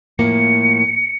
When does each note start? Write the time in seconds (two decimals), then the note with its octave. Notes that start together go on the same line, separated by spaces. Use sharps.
0.19 A2 F3 A#3 C#7